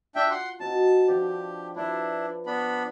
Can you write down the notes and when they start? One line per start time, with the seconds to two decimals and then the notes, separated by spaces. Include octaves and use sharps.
0.15 D4 F4 E5 G5
0.31 F#5 C6
0.60 C4 D#4 F#4 A5
1.08 F3 D4 G4
1.76 D4 E4 B4 D5 C6
2.46 B3 D4 B5